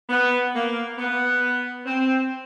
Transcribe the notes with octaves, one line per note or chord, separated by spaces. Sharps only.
B3
A#3
B3
C4